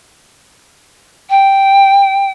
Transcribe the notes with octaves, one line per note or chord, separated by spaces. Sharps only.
G5